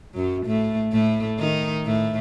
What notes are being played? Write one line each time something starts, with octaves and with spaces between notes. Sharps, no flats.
F#2 F#3
A2 A3
A2 A3
D#3 D#4
A2 A3